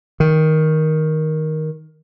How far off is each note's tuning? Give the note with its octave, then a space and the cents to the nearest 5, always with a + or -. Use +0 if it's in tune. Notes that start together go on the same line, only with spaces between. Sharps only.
D#3 +10